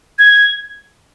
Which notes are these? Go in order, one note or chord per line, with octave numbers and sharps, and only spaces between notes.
G#6